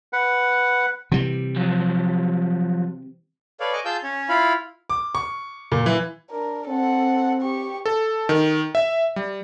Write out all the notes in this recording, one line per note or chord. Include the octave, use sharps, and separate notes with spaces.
B4 F#5
C3 E3 G3
F3 F#3
A4 B4 C#5 D5 F5
D#5 G#5 C#6 D6
F4 G#4 F5 A5 E6 G6
C#4 C#5
E4 F4 F5 B5
D6
C#6
A#2
E3
D4 A#4
C4 A4 F#5
G4 C#6
A4
D#3
E5
G3